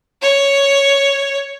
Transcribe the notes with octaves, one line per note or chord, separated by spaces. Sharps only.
C#5